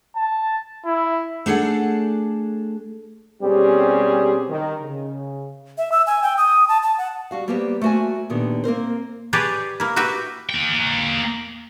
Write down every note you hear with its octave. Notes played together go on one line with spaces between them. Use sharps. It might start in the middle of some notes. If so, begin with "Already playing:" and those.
A5
E4
A3 D4 G#4 A4 F#5
B2 G3 C4 C#4 G4 G#4
D#3
C#3
E5
E6
G#5
G5
D#6
A5
A5
F#5
G3 F#4 F5
G3 A#3 B3 G4 C5 G5
A3 A#3 F#4 C5 G#5
A#2 D3 D#3 B3 G4
A#3 C4 A#4 C5
G4 G#4 B4 C#5 D5 A5
A#3 E4
F#4 G4 B4 E5
A#3 G5